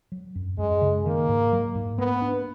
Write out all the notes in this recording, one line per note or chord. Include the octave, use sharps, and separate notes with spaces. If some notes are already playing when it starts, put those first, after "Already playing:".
F#3
F#2
F#2 G#3
C#3
D#3 A#3
G#2
F#3
G#2
A#3 B3
D4